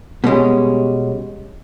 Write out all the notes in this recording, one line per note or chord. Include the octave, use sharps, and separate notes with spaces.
B2 G3 G#3 C#4